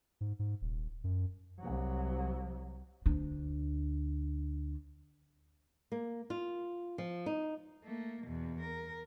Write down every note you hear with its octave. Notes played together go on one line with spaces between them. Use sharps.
G#2
G#2
D#1
F#2
C2 F#3
D2 D4
A#3
F4
F3
D#4
A3 A#3
E2 B2
A#4